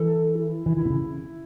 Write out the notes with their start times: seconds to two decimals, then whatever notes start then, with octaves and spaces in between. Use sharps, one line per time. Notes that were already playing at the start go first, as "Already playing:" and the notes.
Already playing: E3 A4
0.35 E4
0.66 E3
0.77 D#3 E4
0.85 B2
0.90 C#3